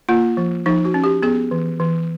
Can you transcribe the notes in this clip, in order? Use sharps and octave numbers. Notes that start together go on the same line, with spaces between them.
A#3 F4
F3
F3 D#4
F#4
C#4
G4
B3 G#4
E3
E3